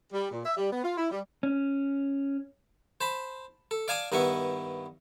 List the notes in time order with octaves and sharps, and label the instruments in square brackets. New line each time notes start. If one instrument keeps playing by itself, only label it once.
[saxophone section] G3
A#2
E5
G3
B3
F4
E4
G3
[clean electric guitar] C#4
[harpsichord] C5 A5 B5
A4
D5 F5 G#5 A5 D6 D#6
G2 D#3 B3 E4 C#6